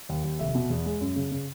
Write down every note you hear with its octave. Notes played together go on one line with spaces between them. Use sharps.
D#2
D#2
F1 E5
B2
E2
G#3
F#2
C#3
C#3